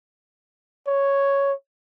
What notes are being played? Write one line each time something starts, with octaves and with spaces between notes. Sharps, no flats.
C#5